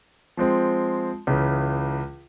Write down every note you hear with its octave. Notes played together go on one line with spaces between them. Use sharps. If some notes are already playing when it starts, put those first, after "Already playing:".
F3 G#3 C4
C#2 C#3 E3